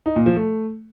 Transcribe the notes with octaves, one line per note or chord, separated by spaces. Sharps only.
D#4
A#2
F3
A3